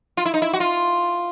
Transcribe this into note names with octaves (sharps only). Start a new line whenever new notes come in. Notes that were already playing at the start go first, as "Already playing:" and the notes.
F4
E4
D#4
E4
F#4
F4